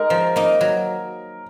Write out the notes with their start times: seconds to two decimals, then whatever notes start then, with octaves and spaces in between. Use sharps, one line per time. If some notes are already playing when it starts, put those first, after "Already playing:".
Already playing: G#3 D#4 A#4
0.10 F3
0.36 A#3 D#4
0.61 F#3